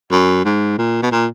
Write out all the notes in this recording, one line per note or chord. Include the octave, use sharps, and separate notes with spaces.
F#2
G#2
A#2
B2
A#2